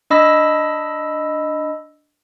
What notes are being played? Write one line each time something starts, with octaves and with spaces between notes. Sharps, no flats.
D4 D#5 B5 E6 A#6